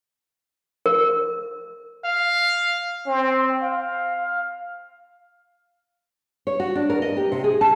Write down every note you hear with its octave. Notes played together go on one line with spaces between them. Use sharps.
A#4
F5
C4
F5
C#5
F#4
D4
A#4
D#5
G4
C3
G#4
A5